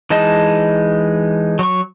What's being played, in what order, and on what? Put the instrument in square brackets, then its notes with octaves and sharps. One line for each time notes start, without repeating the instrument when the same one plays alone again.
[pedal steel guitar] E3 G#3 D#4 D#5 A5
F#3 C#6